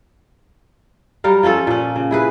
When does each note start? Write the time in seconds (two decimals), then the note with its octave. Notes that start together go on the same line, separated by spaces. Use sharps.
1.24 F#3 G3 A#4 F5
1.43 F3 C#4 F4 A4
1.67 A#2 C#4
1.96 C#3
2.11 E4 G#4 B4